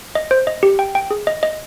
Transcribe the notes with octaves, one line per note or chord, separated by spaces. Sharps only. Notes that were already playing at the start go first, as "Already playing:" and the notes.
D#5
C5
D#5
G4
G5
G5
G#4
D#5
D#5